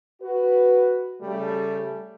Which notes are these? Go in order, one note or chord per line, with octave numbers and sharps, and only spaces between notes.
F#4 B4
C#3 G3 A3